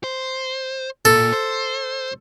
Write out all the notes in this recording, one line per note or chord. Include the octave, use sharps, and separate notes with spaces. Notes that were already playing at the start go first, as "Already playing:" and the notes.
C5
A#2 A4
C5